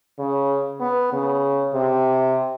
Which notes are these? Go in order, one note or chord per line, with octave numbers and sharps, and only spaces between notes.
C#3
B3
C#3
C3